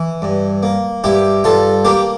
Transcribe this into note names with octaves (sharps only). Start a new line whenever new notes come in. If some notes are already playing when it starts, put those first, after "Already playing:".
Already playing: E3
G2
A#3
G2 E4 G4
G2 F4 A4
A#3 G4 A#4